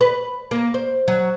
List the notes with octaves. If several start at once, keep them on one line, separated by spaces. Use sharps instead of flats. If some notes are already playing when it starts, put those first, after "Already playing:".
B4
A#3
C5
F#3